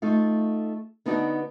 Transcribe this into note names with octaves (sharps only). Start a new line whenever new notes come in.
A3 D#4 F4
D3 B3 D4 D#4 F#4 D5